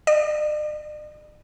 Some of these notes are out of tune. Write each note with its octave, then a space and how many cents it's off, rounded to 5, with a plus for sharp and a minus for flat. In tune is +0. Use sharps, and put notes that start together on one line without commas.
D5 +45